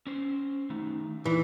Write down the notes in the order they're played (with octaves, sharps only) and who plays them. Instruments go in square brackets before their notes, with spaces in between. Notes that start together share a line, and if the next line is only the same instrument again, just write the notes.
[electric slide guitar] C#4 C5
D#3 A3 D#4
[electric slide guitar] A#2 D#4 [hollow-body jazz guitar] E3